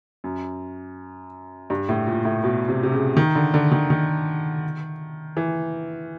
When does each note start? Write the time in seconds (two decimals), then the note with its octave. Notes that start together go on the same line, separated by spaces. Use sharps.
0.24 F#2
1.70 G2
1.89 A2
2.07 A#2
2.25 A2
2.44 B2
2.69 C3
2.83 C3
2.92 C#3
3.17 D#3
3.36 D3
3.54 D3
3.72 D#3
3.90 D#3
5.37 E3